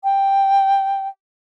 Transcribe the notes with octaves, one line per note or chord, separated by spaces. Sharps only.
G5